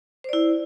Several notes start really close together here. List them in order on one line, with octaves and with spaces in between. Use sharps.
C5 D5 E4